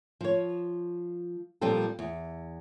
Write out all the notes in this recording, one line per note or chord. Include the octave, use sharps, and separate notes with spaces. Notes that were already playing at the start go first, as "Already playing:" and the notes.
F3 C#5
A#2 F3 G3 C4 F4 A4
E2